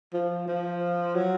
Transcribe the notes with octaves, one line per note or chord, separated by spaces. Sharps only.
F3
F3
F#3